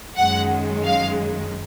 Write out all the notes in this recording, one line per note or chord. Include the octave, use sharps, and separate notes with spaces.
F#2 D#3 G#3 F#5
F5